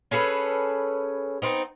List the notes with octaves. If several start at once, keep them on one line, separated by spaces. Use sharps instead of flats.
C#4 G#4 A4 B4
B3 C4 D#4